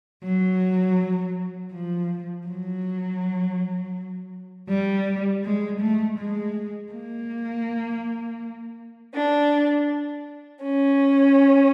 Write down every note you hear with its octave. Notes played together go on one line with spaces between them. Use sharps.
F#3
F3
F#3
G3
G#3
A3
G#3
A#3
D4
C#4